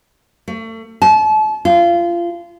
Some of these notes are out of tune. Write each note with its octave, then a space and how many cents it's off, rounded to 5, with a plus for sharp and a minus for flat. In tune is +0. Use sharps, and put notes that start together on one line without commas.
A3 +35
A5 -35
F4 -25